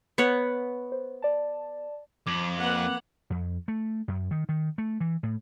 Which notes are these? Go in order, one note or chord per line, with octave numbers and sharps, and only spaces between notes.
B3 C#5 F#5
C5
D5 A5
F2 D6 G#6 F#7
A#3 B4 F#5
F2
A3
F#2
D#3
D#3
A3
E3
A2